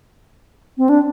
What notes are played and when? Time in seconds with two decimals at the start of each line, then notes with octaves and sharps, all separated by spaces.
0.78 C4
0.89 D4